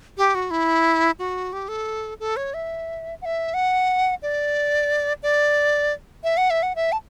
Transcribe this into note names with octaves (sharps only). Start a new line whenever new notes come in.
G4
F#4
E4
F#4
G4
A4
A4
C#5
E5
F#5
E5
F#5
D5
D5
E5
F#5
E5
F#5
E5
A5